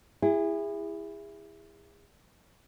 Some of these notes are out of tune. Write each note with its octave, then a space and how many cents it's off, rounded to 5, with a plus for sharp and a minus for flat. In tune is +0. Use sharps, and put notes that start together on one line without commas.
E4 +10 G#4 -35